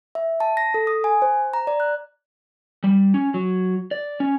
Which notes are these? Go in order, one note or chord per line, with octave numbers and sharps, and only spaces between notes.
E5
A5
A#6
A4
D#6
G#5
C5
A#5
D5
F#6
G3
C#4
F#3
D5
C#4